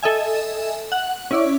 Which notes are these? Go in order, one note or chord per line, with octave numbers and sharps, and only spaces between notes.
A4 D#5 E5 G#5
F#5
C#4 E4 D5